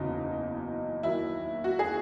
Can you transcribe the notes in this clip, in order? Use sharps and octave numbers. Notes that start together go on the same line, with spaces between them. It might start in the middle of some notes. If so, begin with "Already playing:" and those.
Already playing: F#1 E2 C#3 F#3 D#4
D#2 D#3 F#3 E4
F#4
G#4